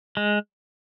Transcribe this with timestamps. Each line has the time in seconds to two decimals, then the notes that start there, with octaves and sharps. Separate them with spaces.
0.17 G#3